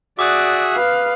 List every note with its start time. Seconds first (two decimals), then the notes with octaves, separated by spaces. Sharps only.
0.19 F#4 G#4 D5 E5 D6 D#6 F#6
0.74 B4 F5